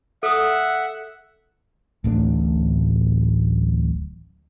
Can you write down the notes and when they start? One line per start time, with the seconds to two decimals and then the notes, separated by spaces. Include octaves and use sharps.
0.23 A4 E5 F#5 D#6
2.04 D1 A1 A3 D4